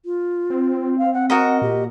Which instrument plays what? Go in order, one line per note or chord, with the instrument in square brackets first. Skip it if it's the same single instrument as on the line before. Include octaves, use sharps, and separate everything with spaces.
[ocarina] F4
[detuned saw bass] C4
[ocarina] F5
F#5
[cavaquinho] F#4 A#4 D#5 [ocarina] F#5
[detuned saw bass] A#2 [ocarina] G4